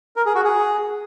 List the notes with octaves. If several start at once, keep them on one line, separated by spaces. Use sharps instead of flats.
A#4
G#4
F#4
G#4